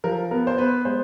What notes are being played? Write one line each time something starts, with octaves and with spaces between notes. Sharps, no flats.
F3 A#4
B3 A#4
C5
B3 B4
G#3 C5